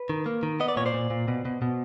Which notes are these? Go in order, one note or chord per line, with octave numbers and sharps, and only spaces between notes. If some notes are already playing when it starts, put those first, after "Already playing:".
Already playing: B4
D#3
A#3
D#3
B3 D#5
D5
A#2 C#5
C5 D5
A#2
A#2
B2
B2
B2